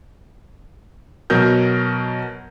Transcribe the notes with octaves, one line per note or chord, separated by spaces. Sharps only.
B2 F#3 A#4 G6